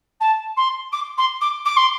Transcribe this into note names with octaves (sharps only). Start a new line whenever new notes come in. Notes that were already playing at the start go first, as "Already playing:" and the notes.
A5
C6
D6
C6
D6
D6
C6